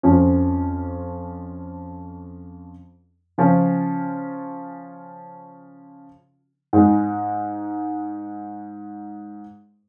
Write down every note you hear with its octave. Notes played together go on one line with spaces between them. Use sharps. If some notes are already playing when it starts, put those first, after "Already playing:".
F2 F3 C#4 F4
C#3 F3 C#4 F4
G#2 G#3 D#4